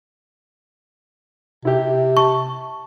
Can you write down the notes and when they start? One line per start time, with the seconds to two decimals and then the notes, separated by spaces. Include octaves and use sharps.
1.65 C3 E4 G4
2.17 A5 C#6